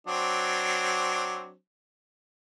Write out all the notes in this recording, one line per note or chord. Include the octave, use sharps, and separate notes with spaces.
F#3 C4 D4